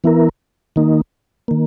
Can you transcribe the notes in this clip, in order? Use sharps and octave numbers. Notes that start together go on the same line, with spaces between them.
E3 B3 E4 A#4
D#3 A#3 D#4
D#3 A#3